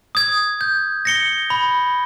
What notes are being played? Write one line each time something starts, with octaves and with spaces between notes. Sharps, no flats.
D#6 G#6
G6
A#6 C#7 G7
B5